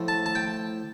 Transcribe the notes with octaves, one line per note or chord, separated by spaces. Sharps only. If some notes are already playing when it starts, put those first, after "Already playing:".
Already playing: A2 F3 A3
A5
A5
G5